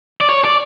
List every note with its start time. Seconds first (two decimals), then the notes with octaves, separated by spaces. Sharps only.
0.21 D5
0.29 C#5
0.44 D5